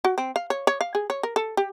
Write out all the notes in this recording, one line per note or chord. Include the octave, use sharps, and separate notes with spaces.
F#4
C4
F5
C#5
C#5
F5
G#4
C#5
A#4
A4
G4